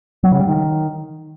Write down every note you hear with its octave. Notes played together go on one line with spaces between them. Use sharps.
F#3
C#3
G3
D#3